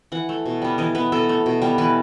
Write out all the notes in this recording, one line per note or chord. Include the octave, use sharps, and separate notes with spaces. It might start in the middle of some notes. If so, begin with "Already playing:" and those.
E3 F#5
A3
B2
G3 B3
E3 D#5
B3 B4
B2 A4
A3
B2
G3 B3
E3 B4